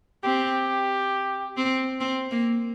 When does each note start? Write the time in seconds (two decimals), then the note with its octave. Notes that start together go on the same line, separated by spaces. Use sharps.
0.24 C4 G4
1.57 C4
2.01 C4
2.31 A#3